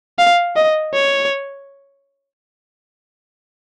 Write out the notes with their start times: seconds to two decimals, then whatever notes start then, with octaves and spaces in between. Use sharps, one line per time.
0.19 F5
0.56 D#5
0.94 C#5